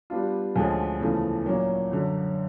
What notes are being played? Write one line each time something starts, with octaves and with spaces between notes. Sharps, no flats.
G3 B3 D4 F4
D2 D3 F3 G#3 C#4
E2 C#3 F3 A3
A#2 F#3 A#3 C#4
F#2 D3 F#3